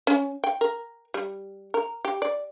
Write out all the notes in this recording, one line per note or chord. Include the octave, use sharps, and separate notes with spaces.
C#4
G5
A#4
G3
A#4
G4
D5